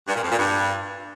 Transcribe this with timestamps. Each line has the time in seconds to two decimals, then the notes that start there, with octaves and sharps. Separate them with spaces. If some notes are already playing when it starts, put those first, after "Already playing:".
0.08 G2
0.16 A#2
0.23 F2
0.31 A#2
0.39 G2